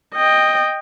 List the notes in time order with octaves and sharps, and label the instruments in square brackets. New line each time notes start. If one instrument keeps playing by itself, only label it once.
[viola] D#5 G5